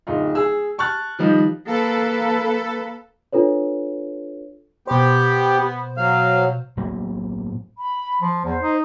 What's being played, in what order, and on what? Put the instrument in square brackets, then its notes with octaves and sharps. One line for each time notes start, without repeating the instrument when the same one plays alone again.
[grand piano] D1 D#4 F4
G#4 E6
A5 C#6 F6 F#6 A6
D#3 F3 G3 D#4
[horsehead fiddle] A#3 B4 [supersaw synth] A4
[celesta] D4 F4 A4 B4 C#5
[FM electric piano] B2 C5 [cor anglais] B3 [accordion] G4
[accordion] F#3 [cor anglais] F5
[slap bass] A2 F#3 A#3 B3
[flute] B5
[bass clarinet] F3
[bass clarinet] E2 [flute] C5
[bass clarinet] D#4